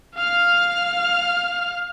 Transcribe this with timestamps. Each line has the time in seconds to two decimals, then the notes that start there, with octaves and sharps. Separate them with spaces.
0.16 F5 F6